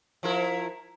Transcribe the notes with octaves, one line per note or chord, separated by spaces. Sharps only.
F3 E4 A#4